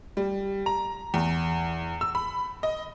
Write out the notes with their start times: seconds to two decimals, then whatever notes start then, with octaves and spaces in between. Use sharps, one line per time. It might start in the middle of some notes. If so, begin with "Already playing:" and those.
0.17 G3
0.66 A#5
1.14 E2
2.01 E6
2.15 B5
2.63 D#5